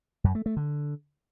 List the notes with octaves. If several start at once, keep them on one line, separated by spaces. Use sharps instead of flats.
F#2
A3
A3
D3